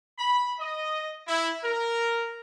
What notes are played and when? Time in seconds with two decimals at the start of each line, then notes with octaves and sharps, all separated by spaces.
0.19 B5
0.60 D#5
1.27 E4
1.64 A#4